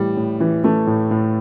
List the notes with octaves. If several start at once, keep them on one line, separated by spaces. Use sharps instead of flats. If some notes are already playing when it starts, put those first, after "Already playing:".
Already playing: A2 E3 G3
A2
E3
E3 A3
A2
A2